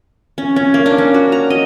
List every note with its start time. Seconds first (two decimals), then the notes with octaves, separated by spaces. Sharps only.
0.38 C#4
0.56 C#4
0.74 A#3
0.86 D4
0.98 C#4
1.14 F#4
1.32 A#5
1.50 D#5